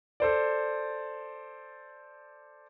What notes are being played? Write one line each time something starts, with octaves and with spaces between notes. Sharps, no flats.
A4 C5 D5